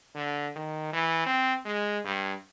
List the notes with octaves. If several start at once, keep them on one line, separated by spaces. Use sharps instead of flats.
D3
D#3
E3
C4
G#3
G2